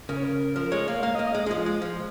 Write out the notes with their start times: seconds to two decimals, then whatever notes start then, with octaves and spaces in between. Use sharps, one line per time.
0.09 C#3 A#4
0.17 C#5
0.24 A#4
0.55 F3 A#4
0.72 G#3 C#5
0.88 A#3 F5
1.03 A#3 F5
1.15 D#5
1.19 A#3
1.27 D#5
1.35 G#3
1.46 G#3
1.51 F3
1.66 G#3
1.82 F3